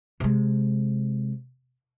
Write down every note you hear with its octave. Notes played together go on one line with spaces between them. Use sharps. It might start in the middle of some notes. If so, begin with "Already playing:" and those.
C3 G#3